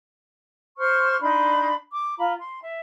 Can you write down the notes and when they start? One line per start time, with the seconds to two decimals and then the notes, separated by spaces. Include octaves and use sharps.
0.78 C5 C6 C#6 F6
1.22 D4 D#4 B5 C6
1.92 D6
2.17 F4 A#5 B5
2.40 C6
2.62 E5